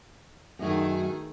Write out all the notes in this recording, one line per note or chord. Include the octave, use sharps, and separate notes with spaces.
F#2 D#3 A3 D#4 F#4 G#4